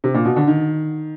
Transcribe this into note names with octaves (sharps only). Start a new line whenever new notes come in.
C3
A#2
B2
D3
D#3